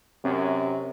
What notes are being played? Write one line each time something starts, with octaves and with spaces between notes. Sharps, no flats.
F#2 C3